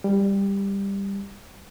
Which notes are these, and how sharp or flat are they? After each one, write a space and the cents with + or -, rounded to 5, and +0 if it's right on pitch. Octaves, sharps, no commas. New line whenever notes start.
G3 +15